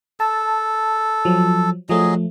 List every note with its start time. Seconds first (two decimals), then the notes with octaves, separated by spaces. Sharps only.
0.20 A4 A5
1.25 F3 F#3
1.89 F3 F#3 A3 G#4 D#5